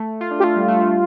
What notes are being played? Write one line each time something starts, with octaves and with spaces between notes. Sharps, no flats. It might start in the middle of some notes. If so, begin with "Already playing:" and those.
Already playing: A3
F4
D4
G4
A3 F4
G3
A3
G3